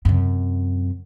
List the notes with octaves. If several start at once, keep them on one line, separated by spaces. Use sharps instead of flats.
F#2 C3